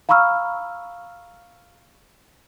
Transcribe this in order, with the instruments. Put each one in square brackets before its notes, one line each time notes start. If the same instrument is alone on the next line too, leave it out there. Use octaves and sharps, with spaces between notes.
[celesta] F5 A#5 B5 C#6 E6 F6